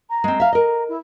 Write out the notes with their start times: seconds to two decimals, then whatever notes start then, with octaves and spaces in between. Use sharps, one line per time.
0.10 A#5
0.24 G#3 C4
0.40 E5 F5
0.53 A#4 D#5
0.89 E4